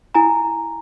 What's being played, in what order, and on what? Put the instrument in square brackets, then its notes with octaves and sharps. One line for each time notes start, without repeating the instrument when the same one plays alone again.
[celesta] E4 G#5 A#5